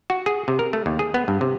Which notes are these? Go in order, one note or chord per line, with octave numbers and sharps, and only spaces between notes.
F#4
G#4
C3
A#4
A3
D#2
G#4
B3
G2
C3